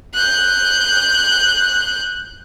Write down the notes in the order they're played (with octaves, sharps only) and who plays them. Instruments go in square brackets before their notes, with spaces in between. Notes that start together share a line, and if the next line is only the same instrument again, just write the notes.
[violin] F#6 G6